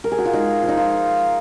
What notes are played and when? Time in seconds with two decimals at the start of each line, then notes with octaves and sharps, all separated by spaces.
0.04 A#4
0.12 G#4
0.18 F#4
0.25 F4
0.33 G#3 D#4
0.63 F3
0.69 D#4
0.77 F4